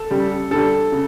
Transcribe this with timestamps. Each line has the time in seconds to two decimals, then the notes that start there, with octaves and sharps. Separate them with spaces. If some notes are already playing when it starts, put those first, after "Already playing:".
Already playing: A4
0.11 C#3 G3
0.51 D3 G3 A4
0.92 C#3